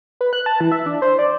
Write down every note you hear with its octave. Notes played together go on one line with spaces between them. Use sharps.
B4
F#6
A5
E3
E5
D4
C5
D5